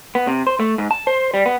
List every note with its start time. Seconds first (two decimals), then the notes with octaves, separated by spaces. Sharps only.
0.15 B3
0.27 C3
0.47 C5
0.60 A3
0.78 G#2
0.91 A5
1.07 C5
1.34 G3
1.46 B3